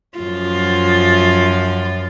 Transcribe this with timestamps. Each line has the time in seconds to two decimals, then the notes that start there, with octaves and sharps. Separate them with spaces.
0.18 F#2 F3 F4